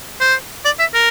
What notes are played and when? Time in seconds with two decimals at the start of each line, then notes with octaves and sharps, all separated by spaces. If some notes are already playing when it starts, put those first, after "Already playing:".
0.21 C5
0.65 D5
0.79 E5
0.94 A#4